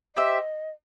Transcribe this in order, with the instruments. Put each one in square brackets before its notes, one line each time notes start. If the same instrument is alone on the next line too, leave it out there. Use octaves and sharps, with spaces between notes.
[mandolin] G4 C5 E5 [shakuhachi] D#5